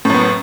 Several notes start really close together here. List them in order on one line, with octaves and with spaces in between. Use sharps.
A2 F#2 B3